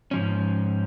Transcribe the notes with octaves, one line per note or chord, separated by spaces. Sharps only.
G#2 F3 C#4